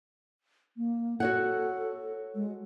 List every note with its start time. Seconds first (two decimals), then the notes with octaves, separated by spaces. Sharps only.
0.77 A#3
1.20 F#4 A4 C#5 F#5
2.35 G#3